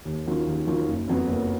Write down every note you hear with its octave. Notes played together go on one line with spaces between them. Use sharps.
D#2
D#3 F#3 C#4 F4
D#2
D#3 F#3 C#4 F4
F#1
F2 C#3 F#3 B3
F#1